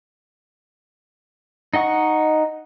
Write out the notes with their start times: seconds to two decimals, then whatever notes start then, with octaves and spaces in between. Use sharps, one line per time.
1.74 D#4 D#5 F#5 C#6